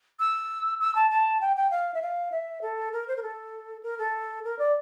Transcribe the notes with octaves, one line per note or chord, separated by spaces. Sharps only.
E6
E6
A5
A5
G5
G5
F5
E5
F5
E5
A4
A#4
C5
A#4
A4
A#4
A4
A#4
D5